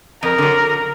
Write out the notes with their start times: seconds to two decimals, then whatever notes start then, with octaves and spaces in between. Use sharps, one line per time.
0.22 F2 A#4
0.38 D3 F#3